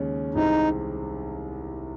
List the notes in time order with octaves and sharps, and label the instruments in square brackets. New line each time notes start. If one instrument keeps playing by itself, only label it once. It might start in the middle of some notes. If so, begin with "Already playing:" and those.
Already playing: [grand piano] D#2 C#3 G#3 C#4
[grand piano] C2 C3 D#3 G#3 [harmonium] D#4